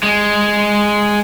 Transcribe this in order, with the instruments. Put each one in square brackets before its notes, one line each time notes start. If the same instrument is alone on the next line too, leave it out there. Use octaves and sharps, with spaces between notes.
[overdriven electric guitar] G#3